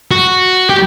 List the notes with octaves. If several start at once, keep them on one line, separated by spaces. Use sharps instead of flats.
F#4
G4